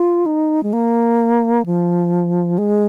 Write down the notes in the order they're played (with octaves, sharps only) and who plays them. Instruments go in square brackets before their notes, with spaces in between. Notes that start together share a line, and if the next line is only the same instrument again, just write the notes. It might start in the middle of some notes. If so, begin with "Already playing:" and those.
Already playing: [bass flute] F4
D#4
G#3
A#3
F3
G#3